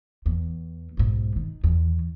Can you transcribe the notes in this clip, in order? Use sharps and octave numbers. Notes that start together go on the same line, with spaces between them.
E2
B1 G#2
D#3
E2 D#3